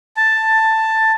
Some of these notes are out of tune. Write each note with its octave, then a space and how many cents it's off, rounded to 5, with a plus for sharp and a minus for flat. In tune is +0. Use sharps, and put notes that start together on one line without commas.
A5 +10